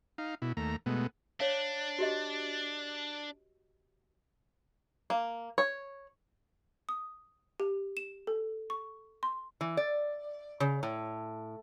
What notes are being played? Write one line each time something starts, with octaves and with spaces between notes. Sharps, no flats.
D#4 F5
B2 E4
D#2 A3 A#5
B2 G#3 A3 B3
D4 C#5 F5
F#4 G4 D#5
A#3
C#5
D#6
G4
E7
A4
C#6
C6
E3
D5
C#3
A2